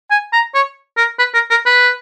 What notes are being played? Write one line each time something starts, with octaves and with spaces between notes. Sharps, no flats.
G#5
A#5
C#5
A#4
B4
A#4
A#4
B4